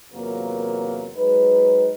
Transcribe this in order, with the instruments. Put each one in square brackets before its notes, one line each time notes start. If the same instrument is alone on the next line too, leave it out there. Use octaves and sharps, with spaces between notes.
[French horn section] E2 C3 F#3 A#3 F4 A#4
F#3 G#3 D#4 B4